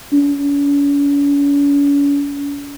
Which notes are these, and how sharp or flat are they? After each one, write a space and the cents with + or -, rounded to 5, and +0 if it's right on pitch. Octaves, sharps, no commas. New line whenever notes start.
C#4 +45